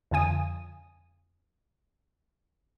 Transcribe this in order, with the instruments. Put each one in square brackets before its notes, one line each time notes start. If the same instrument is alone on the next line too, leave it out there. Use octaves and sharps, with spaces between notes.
[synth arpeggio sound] F2 D3 F4 G#5 D#6